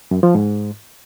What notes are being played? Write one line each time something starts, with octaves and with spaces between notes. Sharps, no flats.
F#2
F3
G#2